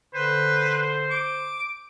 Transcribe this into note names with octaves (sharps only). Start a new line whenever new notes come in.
D3 B4 C5
D6